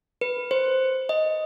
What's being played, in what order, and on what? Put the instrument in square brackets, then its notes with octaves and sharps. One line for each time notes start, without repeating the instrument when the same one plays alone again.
[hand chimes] B4
C5
D#5